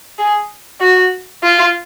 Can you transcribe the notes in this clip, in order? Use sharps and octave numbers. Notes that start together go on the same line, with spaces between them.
G#4
F#4
F4